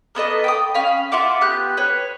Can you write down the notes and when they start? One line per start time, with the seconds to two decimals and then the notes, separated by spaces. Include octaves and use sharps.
0.15 A#3 B3 A4 D#5
0.44 G5 A5 D#6
0.74 C#4 F5 B5
1.12 F4 E5 F#5 D6
1.41 B3 G4 F#6
1.77 B4 C#5